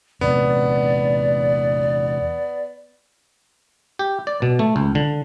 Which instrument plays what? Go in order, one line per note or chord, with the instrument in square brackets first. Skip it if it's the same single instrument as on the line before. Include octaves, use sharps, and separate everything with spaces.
[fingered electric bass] E2 C3 [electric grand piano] B3 [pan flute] D5
[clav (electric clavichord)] G4
D5
B2
A3
C#2
D3